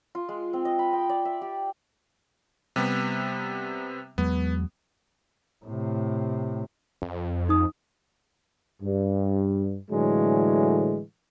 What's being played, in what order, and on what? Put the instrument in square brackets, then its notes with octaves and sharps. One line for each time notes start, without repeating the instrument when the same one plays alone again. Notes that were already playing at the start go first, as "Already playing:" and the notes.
[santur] F4
G#3
C4
D#5
B5
G5
D5
E5
G4
[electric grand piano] C3 G3 B3
[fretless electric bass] E2 F#3 G#3 [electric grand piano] B3
[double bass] A2 C3
[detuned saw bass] F2
[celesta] D#4 D#6
[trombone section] G2
A2 D3 E3 F#3 G#3